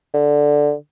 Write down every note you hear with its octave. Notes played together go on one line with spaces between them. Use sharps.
D3